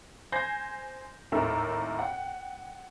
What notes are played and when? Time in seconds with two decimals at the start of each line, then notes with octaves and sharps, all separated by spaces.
0.32 C5 G#5 G6 G#6 A#6 C7
1.32 G#1 D#2 A2 A4 A#4 E5
1.99 F#5 G5